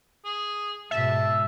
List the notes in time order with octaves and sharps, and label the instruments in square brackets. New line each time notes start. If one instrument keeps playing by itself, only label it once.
[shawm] G#4
[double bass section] G#2 B2 [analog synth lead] E5 [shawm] A5